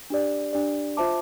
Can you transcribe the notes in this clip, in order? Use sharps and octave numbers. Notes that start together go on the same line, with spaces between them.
D4 G4 D5
D4 G4 D5
F4 C5 E5 A5 D6